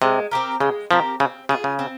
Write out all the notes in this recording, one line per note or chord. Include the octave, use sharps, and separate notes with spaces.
C3 G#3
C4 G4 A#4
C#3 G#3
F3 C4 G4 A#4
C#3 C4
C#3 F4 G#4
C#3
C4